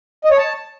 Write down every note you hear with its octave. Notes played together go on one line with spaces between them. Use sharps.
D#5
C#5
A5